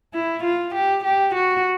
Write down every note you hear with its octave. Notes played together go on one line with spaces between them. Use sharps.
E4
F4
G4
G4
F#4